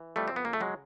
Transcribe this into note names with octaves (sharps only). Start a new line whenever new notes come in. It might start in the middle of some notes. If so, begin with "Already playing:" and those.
Already playing: E3
F2 G3 A3
C4
B3
C#3 A#3
A3
F#3 G#3